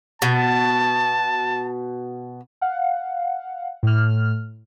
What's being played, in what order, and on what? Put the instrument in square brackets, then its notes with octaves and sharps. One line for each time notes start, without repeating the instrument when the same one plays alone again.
[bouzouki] B2 [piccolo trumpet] A5
[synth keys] F5 F#5
A2 F6